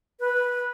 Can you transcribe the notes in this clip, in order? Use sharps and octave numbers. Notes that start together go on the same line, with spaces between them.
B4